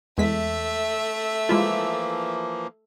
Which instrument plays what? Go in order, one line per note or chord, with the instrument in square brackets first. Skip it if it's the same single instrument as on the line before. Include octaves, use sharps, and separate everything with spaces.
[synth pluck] E2 G#3 B6 [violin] A3 E5
[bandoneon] E3 F3 A#3 [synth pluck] G#3 E4 F4